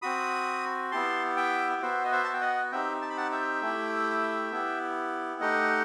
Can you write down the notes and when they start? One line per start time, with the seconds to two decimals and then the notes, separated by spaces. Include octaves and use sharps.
0.02 C4 F#4 B5 D#6
0.91 B3 E4 G4 A5 C6
1.37 E5 G5
1.82 B3 F#4 C5 E5
2.04 D#5
2.12 C5 E5
2.24 A5
2.33 G5
2.41 D#5 F#5
2.72 C4 D#4 G4 E5 G5
3.02 A5
3.10 B5
3.17 F#5 A5
3.31 E5 G5
3.62 A3 E4 G4
4.51 B3 E4 G4
5.41 A3 D#4 G4 D#5 F#5